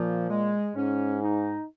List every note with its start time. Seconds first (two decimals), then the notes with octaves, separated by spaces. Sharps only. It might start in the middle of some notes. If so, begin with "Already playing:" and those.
Already playing: A#2 F3
0.30 G#3
0.76 G#2 C#4
1.23 D#4